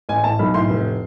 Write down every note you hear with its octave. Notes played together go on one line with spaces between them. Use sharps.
A1 G#5
A2 A5
B1 B5
A2 C6
F1